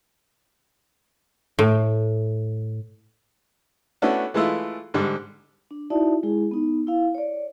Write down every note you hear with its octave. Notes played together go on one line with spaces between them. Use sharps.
A2
A3 B3 C#4 D4 E4 F#4
E3 G#3 A3 E4 F4
G#2 D3 G3
D4
D#4 E4 F#4 D5 E5 A5
G#3 E4 G#4
B3 D#4
E4 F5
C#5 D5